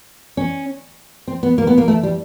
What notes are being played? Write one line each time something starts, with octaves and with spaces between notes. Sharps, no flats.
C#4
C4
B3
A#3
B3
A#3
A3
G3